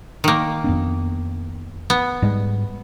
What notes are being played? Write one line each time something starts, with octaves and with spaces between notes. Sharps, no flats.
D#3 A#3
F2 B3 D4
B3
G#2 G3 G#3